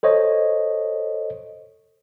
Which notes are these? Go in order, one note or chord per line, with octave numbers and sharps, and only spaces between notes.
A4 C5 C#5 D#5